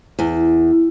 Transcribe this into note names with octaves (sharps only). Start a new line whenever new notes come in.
E2